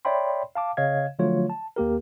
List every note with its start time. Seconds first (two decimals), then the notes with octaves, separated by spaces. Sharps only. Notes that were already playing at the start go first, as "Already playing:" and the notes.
0.05 C#5 D5 E5 G5 B5 C6
0.55 F5 A5 D6
0.77 C#3 C#5 D#5 F5 G#6
1.19 D3 F3 F#3 A3 F4 C#5
1.50 A5
1.76 D#2 A#3 G4 A#4